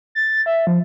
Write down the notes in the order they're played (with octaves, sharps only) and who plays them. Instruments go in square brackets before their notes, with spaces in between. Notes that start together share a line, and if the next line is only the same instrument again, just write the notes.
[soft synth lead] A6
E5
F3